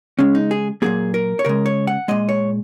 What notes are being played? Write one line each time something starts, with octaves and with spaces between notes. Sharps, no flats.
C#3 G#3 C#4
D#4
G#4
A#2 F#3 A#3 G#4
A#4
C#5
C#3 G#3 A#4
C#5
F#5
A#2 G#3 D#5
C#5